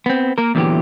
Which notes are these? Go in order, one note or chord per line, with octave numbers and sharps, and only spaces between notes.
B3 C4
A#3 A#4
E2 A#2 D3 E3 F#3 G4